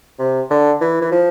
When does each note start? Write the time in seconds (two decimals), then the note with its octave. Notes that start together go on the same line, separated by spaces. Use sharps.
0.19 C3
0.50 D3
0.81 E3
1.02 E3
1.12 F3